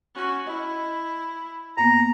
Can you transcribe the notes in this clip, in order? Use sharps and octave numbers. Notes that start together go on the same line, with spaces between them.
C#4 F#4
E4 D#5
F2 A#3 B3 A#5